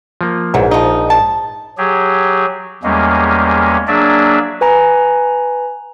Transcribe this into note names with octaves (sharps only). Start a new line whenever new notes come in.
F3 A#3
A#1 G#2 E3 F#3
F3 D#4
A5
F#3 G4 G#4
E2 G3 G#3 A#3 C#4
F#3 A#3 D4 G#4 D5 E5
B4 G#5 A#5